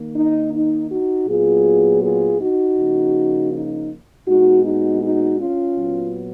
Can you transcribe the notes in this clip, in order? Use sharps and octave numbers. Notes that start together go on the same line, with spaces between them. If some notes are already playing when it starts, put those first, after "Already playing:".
Already playing: D#3 A#3
D#4
D#4
D#4 F#4
A#2 F#3 B3 F4 G#4
F4 G#4
D#4 F#4
C#3 F3 A#3
D#4
A#2 G#3 B3 D#4 F#4
D#4 F#4
D#4 F#4
C#4 F4
A#2 F#3 B3